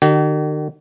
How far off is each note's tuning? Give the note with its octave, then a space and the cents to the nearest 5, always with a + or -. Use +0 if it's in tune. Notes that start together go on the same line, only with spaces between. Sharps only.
D#3 -45 G4 -45